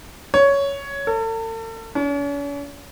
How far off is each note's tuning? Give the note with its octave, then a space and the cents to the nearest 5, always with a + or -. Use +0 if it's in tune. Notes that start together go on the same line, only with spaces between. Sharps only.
C#5 +10
A4 +40
C#4 +45